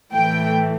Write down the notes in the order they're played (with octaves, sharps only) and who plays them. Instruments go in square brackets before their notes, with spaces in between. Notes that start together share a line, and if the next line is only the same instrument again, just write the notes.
[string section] A2 E3 A3 G5